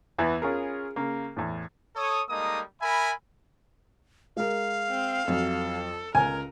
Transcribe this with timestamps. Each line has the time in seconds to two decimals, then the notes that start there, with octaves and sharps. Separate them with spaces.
0.19 E2 E3 B3 E5
0.42 C#4 F4 G#4 A#4
0.96 C#3 A#3
1.37 E2 A2
1.96 A4 C#5 D#6
2.29 G3 G#3 A#3 D#4 A4 D#6
2.82 A#4 E5 G#5 B5
4.37 G#3 A#4 F5
4.89 C4
5.28 F2 F#3 A4
6.15 C#2 C#3 A#4 G#5